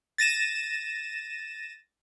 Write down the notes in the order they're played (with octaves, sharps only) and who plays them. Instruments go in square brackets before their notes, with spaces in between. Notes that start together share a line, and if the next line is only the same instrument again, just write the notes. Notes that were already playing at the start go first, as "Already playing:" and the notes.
[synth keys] A6 A#6 D#7 E7